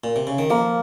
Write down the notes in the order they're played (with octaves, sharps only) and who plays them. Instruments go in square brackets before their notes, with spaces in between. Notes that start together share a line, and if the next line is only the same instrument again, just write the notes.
[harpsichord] A#2
C3
C#3
D#3
[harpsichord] F3 [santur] A#3